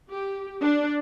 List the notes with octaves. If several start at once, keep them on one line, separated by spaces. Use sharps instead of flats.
G4
D4